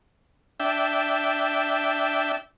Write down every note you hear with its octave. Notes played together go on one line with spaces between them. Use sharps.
D4 E5 G5